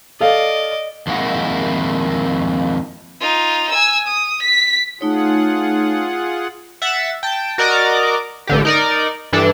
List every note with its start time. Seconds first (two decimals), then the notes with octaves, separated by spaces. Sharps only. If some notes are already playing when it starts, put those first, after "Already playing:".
0.20 A4 D5 D#5 F5
1.07 F2 D#3 G#3 A#3 E4 F#5
3.20 D#4 F4
3.71 G#5 E6
4.07 D#6
4.42 B6
5.01 A3 D#4 F4 G#4 C#5 F#5
6.82 E5 F#5 A6
7.23 G5 A5
7.58 F#4 A#4 D5 D#5 A#5 D6
8.47 A1 D3 G4
8.65 D#4 A#4 D5
9.33 G2 E3 D4 A4